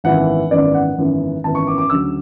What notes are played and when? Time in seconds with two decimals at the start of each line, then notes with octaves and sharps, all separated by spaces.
0.04 G#1 F#2 E3 B3 F#5
0.51 G#1 F#2 E3 B3 D5
0.75 F#5
0.98 G#1 F#2 E3 B3
1.44 G#1 F#2 E3 B3 A5
1.55 C#6
1.67 D6
1.78 D6
1.90 D2 C#3 F#3 E6